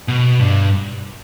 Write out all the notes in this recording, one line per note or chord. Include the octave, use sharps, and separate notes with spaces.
B2
G2